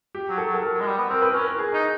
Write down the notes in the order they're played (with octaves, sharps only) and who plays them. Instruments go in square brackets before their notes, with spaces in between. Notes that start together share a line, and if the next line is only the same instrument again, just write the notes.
[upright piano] G4
[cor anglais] F#3
[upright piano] A4
[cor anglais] F#3
[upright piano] A4
A#4
[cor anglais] F#3
G#3
G3
B3
[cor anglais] C4 [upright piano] A#4
[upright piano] B4
A#4
[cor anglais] C#4 [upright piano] B4
[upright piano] A#4
G#4
[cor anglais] D#4